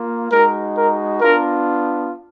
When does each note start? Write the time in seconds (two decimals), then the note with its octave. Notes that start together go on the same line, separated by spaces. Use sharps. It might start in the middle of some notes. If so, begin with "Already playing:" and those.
Already playing: A#3 F4
0.32 G#3 D#4 F#4 A#4
0.76 A#4
1.21 B3 D4 F4 A#4